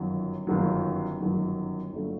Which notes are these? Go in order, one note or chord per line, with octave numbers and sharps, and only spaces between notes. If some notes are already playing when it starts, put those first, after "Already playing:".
Already playing: G1 F#2 D#3 F#3
G1 F#2 D#3 F#3
G1 F#2 D#3 F#3
G1 D3 F#3 A3